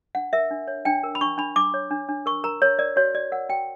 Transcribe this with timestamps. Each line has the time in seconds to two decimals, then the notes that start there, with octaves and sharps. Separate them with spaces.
0.15 D4 F#5
0.33 A#4 E5
0.51 D4
0.68 C#5
0.85 D4 G5
1.04 A#4
1.15 B5
1.21 D4 C#6
1.38 D4 B5
1.56 D4 D6
1.74 C#5
1.91 D4
2.09 D4
2.26 A#4 C#6
2.44 A#4 A#5
2.62 A#4 C#5
2.79 A#4 D5
2.96 F#4 C#5
3.15 F#4 D5
3.32 A#4 F#5
3.49 F#4 G5